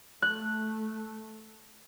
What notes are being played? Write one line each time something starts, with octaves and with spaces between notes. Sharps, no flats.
A3 F#6